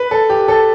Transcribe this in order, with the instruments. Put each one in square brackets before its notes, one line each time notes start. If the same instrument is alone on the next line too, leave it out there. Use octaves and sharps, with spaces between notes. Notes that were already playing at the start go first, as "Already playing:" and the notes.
Already playing: [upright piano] B4
A4
G4
A4